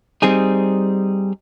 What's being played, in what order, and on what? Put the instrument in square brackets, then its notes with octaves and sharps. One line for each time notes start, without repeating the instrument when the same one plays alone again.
[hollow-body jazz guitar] G3 C4 D#4 G#4